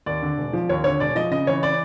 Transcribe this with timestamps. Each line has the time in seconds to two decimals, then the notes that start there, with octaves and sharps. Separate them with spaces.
0.06 D#2 D5
0.22 D3
0.38 E1
0.53 F3
0.69 D#2 C#5
0.84 D3 C#5
1.00 E1 D5
1.16 F3 D#5
1.31 C#3 D#5
1.47 E3 C#5
1.63 D5